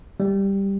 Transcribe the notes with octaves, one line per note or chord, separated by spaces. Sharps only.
G3